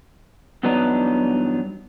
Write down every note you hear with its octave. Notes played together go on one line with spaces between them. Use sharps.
E2 G2 F#3 B3 D4 D#4